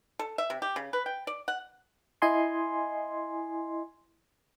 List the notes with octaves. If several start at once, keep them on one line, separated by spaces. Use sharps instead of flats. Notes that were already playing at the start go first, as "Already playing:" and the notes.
A4
E5
C3
G4
C#3
B4
G5
D5
F#5
E4 D#5 G#5 C6